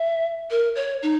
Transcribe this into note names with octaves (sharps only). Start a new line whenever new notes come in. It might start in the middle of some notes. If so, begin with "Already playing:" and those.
Already playing: E5
A#4
C#5
D#4